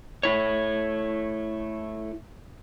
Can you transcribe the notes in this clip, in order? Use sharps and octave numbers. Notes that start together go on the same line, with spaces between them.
A3 E4 C#5